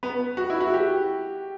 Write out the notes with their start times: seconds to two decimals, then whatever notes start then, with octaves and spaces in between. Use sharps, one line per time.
0.03 B3
0.37 F#4
0.50 E4
0.60 F#4
0.73 G4